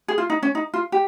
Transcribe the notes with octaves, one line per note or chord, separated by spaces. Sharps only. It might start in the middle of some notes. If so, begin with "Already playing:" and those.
G#4
F4
D#4
C#4
D#4
F4
G4